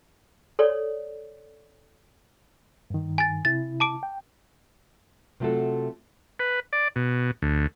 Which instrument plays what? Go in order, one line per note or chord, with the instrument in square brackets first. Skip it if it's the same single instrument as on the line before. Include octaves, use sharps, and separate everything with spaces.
[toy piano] A4 C#5 D5
[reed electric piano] G2 D#3
[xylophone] G#5 A6
[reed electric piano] C3 E4 [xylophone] A6
[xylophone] A5 D6 D7
[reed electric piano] G5
[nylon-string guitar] C3 F#3 A3 F4 F#4 A4
[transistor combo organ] B4
D5
B2
D2